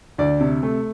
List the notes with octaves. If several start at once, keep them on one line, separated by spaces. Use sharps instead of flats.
D2 D5
C3
A3